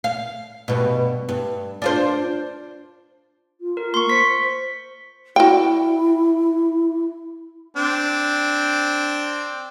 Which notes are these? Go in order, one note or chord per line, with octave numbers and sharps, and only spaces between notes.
F5
G2 B2
G2
D4 F4 C5
F4
A#4
A#3 C6 C#6
C5 B6 C#7
E4 F#4 G5
C4 D4